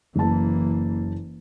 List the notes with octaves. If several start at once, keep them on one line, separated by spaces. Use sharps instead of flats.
F#1 E3 A#3 A5